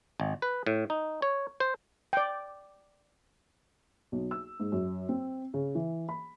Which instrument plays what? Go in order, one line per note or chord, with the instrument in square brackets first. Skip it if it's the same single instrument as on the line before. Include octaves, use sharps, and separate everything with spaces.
[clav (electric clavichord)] G#1
B4
A2
D#4
C#5
C5
[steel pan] D5 G5
[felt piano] B1
E6
G#2
F#2
C4
C#3
E3
B5